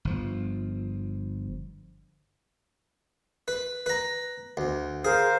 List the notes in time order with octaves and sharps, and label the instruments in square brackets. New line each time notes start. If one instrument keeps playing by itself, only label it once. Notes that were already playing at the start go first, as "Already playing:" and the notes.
[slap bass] G1 F3
[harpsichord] B4
B4 A#5
D2
[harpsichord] G#4 [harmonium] A#4 C5 F5